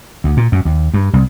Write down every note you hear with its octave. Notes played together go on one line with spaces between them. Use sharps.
D2
A#2
F#2
D#2
G2
C2